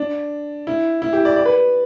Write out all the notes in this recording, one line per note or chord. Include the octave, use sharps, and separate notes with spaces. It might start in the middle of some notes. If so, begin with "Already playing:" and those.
Already playing: D4
E4
E4
G4
D5
D5
B4